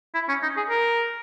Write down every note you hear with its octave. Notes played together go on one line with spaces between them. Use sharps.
E4
C#4
D#4
G#4
A#4